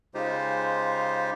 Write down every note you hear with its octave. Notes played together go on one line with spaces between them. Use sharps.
C#3 G#3 D#4 F4 G4 C5